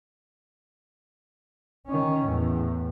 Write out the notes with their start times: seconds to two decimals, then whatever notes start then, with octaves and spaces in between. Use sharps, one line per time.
1.87 D#3 C#4
2.27 E2 A2